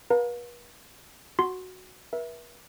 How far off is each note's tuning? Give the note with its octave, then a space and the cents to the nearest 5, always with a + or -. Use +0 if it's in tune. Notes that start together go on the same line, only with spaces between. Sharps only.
B4 -40 F5 +35 A#5 -40
F#4 +0 C6 +0
B4 -45 E5 +0